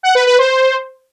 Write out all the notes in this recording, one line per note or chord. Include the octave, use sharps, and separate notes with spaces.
F#5
B4
B4
C5